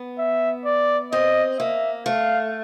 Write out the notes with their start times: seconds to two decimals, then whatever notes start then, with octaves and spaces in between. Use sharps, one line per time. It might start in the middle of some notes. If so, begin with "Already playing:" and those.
Already playing: B3
0.18 E5
0.65 D5
1.12 C4 D#5
1.59 A#3 E5
2.06 A3 F5